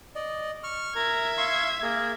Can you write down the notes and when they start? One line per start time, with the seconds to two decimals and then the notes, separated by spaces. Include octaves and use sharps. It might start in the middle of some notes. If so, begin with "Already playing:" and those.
0.15 D5 D#5
0.64 C#6 F6
0.95 A#4 E5 A#5 G#6
1.38 F5 C6 C#6
1.83 A#3 G#4 A#4